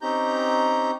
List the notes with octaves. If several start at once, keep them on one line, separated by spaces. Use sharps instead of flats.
C4 C#4 D#4 G4 A#5 G6